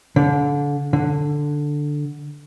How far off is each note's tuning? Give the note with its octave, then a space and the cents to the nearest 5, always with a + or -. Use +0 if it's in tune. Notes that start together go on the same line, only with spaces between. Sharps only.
D3 -30
D3 +5